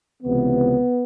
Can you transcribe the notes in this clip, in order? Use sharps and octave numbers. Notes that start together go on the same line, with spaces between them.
C#2 C3 E3 B3